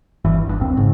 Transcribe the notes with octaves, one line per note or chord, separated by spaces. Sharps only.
G1 G2 E3
F#1 G2
D#1 A#1 C4
G#2 C#3